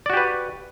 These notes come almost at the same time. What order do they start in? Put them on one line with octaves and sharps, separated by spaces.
D5 F#4 G4 B4